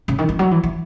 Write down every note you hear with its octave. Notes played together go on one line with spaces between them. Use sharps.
C#3
D#3
E3
F#3
E3
E3